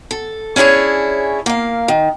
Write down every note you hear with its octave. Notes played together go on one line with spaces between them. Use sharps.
A4
C#4 D4 E4 G#4 C#5
A#3 F5
D#3